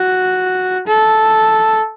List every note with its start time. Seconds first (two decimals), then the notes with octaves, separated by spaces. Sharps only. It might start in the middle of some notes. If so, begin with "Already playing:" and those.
Already playing: F#4
0.87 A4